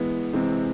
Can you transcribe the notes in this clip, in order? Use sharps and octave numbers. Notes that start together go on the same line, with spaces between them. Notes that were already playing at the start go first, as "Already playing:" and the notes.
Already playing: E3 G#3 B3
C3 E3 G#3 C4